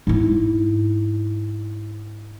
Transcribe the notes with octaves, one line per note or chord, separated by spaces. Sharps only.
G#2 E4